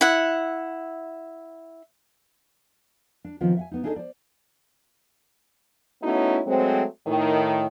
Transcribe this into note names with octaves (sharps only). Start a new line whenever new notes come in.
E4 F#5
D4
D#3 F3 B3 C4 F4
E5 F#5 G#5
B3 D#4
D4 D#4 G#4 A4 C5 D#5
C5 D5
A3 B3 C#4 D#4 E4 F#4
F#3 G#3 A3 C4
A2 D#3